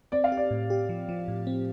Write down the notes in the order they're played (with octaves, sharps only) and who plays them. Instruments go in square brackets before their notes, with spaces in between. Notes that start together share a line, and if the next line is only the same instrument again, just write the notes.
[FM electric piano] C4 [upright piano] D5
[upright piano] F5
[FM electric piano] G4
[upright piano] D5
[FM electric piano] A2
G4
F3
F3
A2
C4